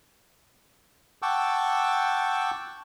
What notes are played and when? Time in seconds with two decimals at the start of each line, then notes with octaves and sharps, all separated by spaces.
1.22 F#5 G5 A5 C#6 D6 E6